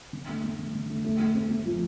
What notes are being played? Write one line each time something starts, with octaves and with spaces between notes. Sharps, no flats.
D3
A3
A3
D3
D3
A3
A3
A3
C4
A3
F3